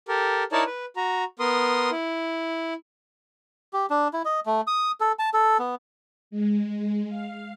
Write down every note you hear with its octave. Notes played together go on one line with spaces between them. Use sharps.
G4 A4 A#4
D#4 E4 A#4 C#5 D5 A5
B4
F#4 A#5
B3 A#4 C6 D#6
E4
G4
D4
E4
D#5
A3
D#6
A4
A5
A4
B3
G#3
F5